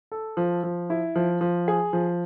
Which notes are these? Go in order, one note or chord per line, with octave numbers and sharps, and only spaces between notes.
A4
F3
F3
E4
F3
F3
G#4
F3